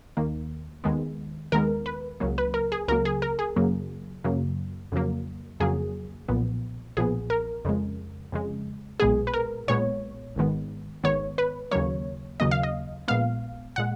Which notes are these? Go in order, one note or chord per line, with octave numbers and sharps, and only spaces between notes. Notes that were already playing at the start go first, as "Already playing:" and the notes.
D#2 D#3 A#3
D#2 D#3 G#3 B3
D#2 D#3 G#3 B3 A#4
B4
C#2 C#3 F#3 A#3
B4
A#4
G#4
C#2 C#3 F#3 A#3 A#4
G#4
A#4
G#4
F#2 C#3 F#3 A#3
F#2 C#3 F#3 A#3
F2 C#3 F#3 A#3
F2 C#3 F#3 A#3 G#4
B1 A#2 F3 B3
B1 A#2 F3 B3 G#4
A#4
F2 C#3 G#3
F2 C#3 G#3
B1 A#2 G#3 B3 G#4
B4
A#4
B1 A#2 G#3 B3 C#5
G#1 G#2 D#3 G#3 B3
G#1 G#2 D#3 G#3 B3 C#5
B4
D#2 C#3 F#3 A#3 C#5
D#2 C#3 F#3 A#3 D#5
F5
D#5
A#1 A#2 G#3 B3 F5
A#2 G#3 F#5